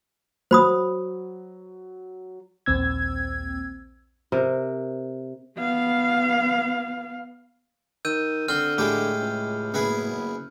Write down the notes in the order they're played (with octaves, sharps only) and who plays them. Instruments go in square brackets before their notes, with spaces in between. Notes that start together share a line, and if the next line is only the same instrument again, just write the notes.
[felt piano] F#3 [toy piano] C5 B5 D#6
[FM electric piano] A#1 D#2 C4 E6 G#6
[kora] C3 A#4
[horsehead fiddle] B3 F5
[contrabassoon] D#3 [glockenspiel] E6 G6 D#7
[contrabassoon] D3 [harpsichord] C4 [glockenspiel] F6 G7
[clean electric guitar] A2 [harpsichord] G#3 G4
[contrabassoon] C#2
[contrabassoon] F#1 [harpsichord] B3 E4 G#4